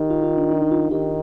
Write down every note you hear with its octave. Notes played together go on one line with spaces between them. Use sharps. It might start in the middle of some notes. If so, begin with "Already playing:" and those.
Already playing: D#3 D#4 G4
F4
F4
D4
D4
D#4
F4
D#3 G4